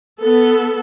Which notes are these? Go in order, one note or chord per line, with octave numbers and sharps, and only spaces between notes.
B3 A4